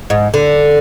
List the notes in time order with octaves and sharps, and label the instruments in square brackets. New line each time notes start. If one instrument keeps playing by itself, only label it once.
[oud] G#2
D3